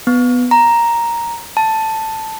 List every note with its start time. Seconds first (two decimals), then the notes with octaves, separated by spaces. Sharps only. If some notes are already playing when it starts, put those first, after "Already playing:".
0.07 B3
0.51 A#5
1.57 A5